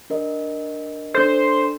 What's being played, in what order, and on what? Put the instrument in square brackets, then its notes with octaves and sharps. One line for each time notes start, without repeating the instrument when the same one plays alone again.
[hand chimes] D4 A#4 D#5
[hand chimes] D4 A4 [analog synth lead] C5